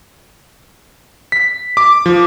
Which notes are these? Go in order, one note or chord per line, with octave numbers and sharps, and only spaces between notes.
B6
D6
F3